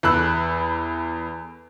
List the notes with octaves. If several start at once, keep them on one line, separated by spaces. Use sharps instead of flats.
E2 A4 B5 E6 F#6